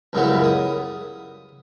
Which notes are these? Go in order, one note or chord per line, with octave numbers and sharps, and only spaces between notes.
C#2 F#2 A#2 G3 B3 E4
D#6